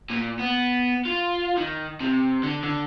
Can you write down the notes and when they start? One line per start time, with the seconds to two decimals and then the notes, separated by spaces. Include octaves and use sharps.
0.10 A#2
0.39 B3
1.05 F4
1.57 D#3
2.00 C3
2.43 D3
2.63 D3